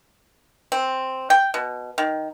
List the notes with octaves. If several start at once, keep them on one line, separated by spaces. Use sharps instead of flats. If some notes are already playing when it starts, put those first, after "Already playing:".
C4
G5
B2
D#3